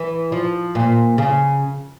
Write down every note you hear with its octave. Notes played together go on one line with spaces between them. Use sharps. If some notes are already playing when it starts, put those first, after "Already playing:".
Already playing: E3
F3
A#2
C#3